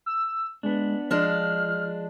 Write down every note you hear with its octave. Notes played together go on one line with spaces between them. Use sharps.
E6
G#3 B3 D4
F3 G#3 D4 F6